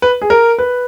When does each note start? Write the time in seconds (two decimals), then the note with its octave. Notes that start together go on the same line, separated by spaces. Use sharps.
0.02 B4
0.22 G#4
0.30 A#4
0.59 B4